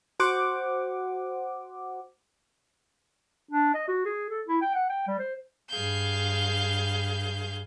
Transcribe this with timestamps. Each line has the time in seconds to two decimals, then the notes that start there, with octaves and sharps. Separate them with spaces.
0.20 F#4 C5 F#5 D6
3.51 D4
3.74 D#5
3.88 F#4
4.05 G#4
4.30 A4
4.48 E4
4.62 G5
4.74 F#5
4.89 G5
5.07 G3
5.19 C5
5.70 G2 G#4 F5 G6